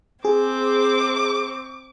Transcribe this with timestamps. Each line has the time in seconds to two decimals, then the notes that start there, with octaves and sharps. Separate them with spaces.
0.25 C4 G#4 D6